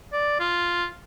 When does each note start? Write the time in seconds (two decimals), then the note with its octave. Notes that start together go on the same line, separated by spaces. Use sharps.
0.13 D5
0.40 F4